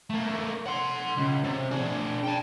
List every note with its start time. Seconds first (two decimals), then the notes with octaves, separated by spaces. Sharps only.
0.10 A3 A#3
0.67 F#5 C6
1.17 C#2
1.44 C3
1.71 D4 G#4
2.23 G5 A5